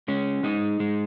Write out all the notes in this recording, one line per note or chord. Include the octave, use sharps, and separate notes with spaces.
G#3 C#4
G#3 D#4
G#3